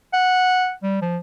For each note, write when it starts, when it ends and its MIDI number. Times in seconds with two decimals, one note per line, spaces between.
0.13 0.72 78
0.83 1.00 55
1.02 1.18 53